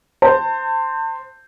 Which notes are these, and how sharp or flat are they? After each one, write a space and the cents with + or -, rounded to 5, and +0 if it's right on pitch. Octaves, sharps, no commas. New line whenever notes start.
C5 +0 A5 +35